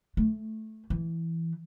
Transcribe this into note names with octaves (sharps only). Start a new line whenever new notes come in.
A3
E3